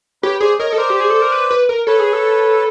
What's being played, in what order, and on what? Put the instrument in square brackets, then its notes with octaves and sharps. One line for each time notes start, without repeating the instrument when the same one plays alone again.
[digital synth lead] G4 [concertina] B4 C#5
[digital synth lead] G#4 [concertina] C5 D5
[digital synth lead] A#4 [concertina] C#5 D#5
[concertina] D#5
[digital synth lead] A4
[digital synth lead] A#4 [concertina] C5 D5
[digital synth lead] G4
G#4
A4
A#4
B4
B4
A#4
[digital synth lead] A4 [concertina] B4 C#5
[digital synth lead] G#4
A4